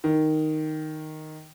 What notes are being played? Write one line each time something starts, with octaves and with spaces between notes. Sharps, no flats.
D#3